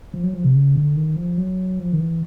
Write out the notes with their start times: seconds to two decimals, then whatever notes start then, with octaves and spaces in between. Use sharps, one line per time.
0.14 F3
0.23 F#3
0.34 F3
0.44 C3
0.55 C#3
0.76 D3
0.96 D#3
1.16 F3
1.37 F#3
1.79 F3
1.92 D#3
2.00 E3